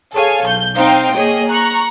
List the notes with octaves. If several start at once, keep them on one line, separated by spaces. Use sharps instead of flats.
G#4 A4 C#5 F5 G#5
B1 G6
C4 D#4 C5 F5 G5
A#3 G#4 C#5 D#5
A#5 C#6 F#6